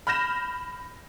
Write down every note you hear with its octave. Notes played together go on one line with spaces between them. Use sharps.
B5 F6 G6 A#6 E7